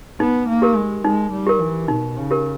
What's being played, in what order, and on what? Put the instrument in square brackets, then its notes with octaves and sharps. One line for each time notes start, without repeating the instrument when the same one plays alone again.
[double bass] B3 [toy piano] D#4
[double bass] A#3
[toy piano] G4 A#4
[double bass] G#3
[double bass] G#3 [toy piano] D#4
[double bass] G3
[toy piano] G4 A#4
[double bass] E3
[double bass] B2 [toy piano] D#4
[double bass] C#3
[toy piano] G4 A#4